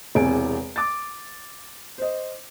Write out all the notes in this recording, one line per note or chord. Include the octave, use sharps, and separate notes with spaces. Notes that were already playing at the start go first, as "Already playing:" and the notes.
E1 E2 C3 G#5 D7
D6 A6
C5 D#5